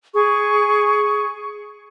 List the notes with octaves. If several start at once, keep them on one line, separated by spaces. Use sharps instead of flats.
G#4 C#6